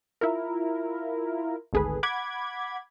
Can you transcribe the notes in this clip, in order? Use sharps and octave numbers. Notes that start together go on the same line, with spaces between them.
E4 F4 A#4
G#1 D2 G#4 A4 B4
F#5 B5 D6 G#6